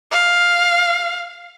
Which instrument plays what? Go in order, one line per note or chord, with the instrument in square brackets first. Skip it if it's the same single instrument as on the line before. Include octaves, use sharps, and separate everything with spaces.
[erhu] F5